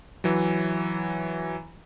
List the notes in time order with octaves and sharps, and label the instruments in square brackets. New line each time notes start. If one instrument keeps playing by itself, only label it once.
[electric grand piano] E3 F#3